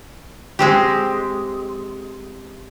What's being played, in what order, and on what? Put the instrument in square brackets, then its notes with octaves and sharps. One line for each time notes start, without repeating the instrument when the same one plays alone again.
[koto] G#3 C4 G4